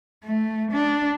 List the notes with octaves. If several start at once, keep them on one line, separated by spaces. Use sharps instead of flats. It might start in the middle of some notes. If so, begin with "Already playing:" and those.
A3
D4